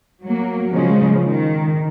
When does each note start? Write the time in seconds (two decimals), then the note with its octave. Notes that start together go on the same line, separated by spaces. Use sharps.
0.23 F#3 A#3
0.73 C#3 F3 G#3 C#4
1.25 D#3